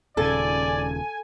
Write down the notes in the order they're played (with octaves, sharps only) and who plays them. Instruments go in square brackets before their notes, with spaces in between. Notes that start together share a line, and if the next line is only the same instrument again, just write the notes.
[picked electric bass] D#1 C#3 [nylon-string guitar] A4 [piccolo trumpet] D5 [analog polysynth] G#5